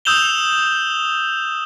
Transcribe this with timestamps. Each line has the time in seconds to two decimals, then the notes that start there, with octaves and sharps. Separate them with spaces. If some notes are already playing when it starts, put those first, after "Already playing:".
0.05 D#6 E6 G6 E7 F7 G7